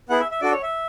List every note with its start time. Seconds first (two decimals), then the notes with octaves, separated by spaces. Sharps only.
0.09 B3 E4 G#4 F#5
0.20 E5
0.31 E5
0.41 D4 F#4 A4 D5
0.52 C#5
0.63 E5